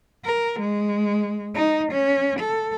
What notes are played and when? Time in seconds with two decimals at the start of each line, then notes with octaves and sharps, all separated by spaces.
0.25 A#4
0.59 G#3
1.55 D#4
1.92 C#4
2.39 A4